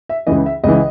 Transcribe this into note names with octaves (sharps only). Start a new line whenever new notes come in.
E5
C#2 C#3 E3 D#5
E5
C#2 C#3 E3 D#5